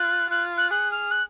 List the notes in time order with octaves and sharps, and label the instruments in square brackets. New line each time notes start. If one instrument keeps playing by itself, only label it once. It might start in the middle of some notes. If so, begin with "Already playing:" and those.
Already playing: [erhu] F4 [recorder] F#6
[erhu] F4 [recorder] F#6
[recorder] F#6
[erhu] G#4 [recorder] F#6
[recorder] F6
F#6